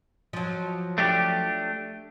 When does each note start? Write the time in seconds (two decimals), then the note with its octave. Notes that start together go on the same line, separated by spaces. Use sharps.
0.33 F3 F#3
0.98 A3 D4 G4